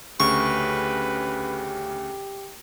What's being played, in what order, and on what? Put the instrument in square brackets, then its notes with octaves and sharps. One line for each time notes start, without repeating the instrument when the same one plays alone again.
[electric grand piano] D2 C#3 [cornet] G4 [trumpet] B4 [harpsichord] C#6